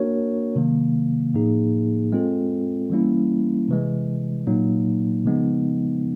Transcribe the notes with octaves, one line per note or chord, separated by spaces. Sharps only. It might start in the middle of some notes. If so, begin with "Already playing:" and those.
Already playing: A#3 D4 F#4 A#4 C#5
C3 D#3 F#3 A#3
A2 F3 A#3 D#4 G#4
G#3 C4 F4 A4
E3 G3 A#3 C#4 E4
C3 E3 G#3
A#2 F#3 A#3 D#4
C#3 F3 G#3 B3 D#4